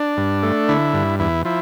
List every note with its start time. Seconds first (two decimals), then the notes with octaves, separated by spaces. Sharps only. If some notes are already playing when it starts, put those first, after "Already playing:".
Already playing: D4
0.17 G2
0.43 A3
0.69 D3 E4
0.93 G2
1.20 E2 E4
1.45 F3 E4